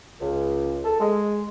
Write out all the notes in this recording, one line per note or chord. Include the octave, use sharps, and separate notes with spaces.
C#2
A4
G#3